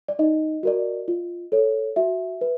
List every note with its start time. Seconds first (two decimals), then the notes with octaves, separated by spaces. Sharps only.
0.08 D5
0.19 D#4 D#5
0.63 F#4 A#4 D5
1.08 F4
1.52 A4 C#5
1.96 F#4 E5
2.41 B4